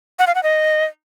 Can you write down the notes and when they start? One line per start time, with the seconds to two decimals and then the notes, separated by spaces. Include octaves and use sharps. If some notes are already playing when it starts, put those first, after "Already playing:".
0.19 F#5
0.27 F5
0.35 F#5
0.43 D#5